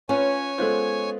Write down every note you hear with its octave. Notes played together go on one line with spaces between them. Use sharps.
C#4 F4 B4 C#5 G#5
G#3 B3 F4 A4 B4 C5